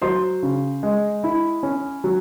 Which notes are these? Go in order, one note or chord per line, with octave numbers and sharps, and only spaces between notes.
F#3 C5 C6
C#3
G#3
E4
C#4
F#3